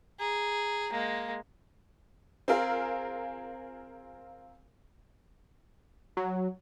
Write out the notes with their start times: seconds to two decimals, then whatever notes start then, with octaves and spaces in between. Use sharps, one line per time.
0.20 G#4 A#5
0.90 G#3 A#3
2.48 C4 F4 G#4 A#4 F5
6.17 F#3